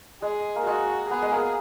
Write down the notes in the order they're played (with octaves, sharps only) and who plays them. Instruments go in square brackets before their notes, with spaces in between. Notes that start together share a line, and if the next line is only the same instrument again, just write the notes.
[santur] G#3 [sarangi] G#4
[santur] A#3
[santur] G#3 [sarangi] F#4
[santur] B3 [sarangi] G#4
[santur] G#3
A#3